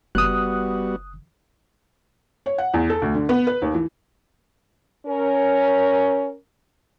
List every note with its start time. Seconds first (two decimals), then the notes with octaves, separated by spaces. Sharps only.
0.15 F#1 G3 B3 F#4 D#6 F#6
2.46 C#5
2.58 F#5
2.74 E2
2.90 A4
3.02 D2
3.15 D3
3.29 B3
3.47 B4
3.62 D#2
3.74 E3
5.06 C#4 A#4